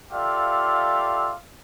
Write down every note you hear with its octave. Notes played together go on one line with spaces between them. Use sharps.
F4 G4 A4 D5 E5 F5